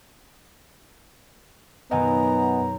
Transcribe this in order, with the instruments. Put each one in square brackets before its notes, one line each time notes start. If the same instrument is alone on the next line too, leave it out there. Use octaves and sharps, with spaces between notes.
[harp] F#2 B2 D#3 [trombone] B3 [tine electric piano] D#5 F#5 G#5 [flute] A#5